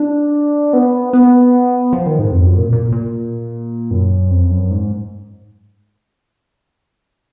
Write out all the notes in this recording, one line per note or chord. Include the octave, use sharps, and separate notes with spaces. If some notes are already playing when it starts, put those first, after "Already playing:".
Already playing: D4
B3
B3
F3
D#3
G#2
F2
F#2
A#2
A#2
A#2
F#2
F2
F#2
G#2